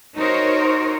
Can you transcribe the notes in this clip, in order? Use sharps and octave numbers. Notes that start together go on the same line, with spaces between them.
D#4 F#4 A#4 C5 C#5